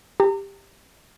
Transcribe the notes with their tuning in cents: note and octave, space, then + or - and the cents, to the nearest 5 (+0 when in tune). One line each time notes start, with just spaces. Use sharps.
G4 +10 A#5 -35